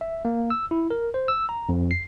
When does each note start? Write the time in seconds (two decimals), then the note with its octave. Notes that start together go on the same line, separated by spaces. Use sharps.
0.01 E5
0.25 A#3
0.50 E6
0.71 E4
0.90 A#4
1.14 C5
1.28 E6
1.49 A#5
1.69 F2
1.91 C7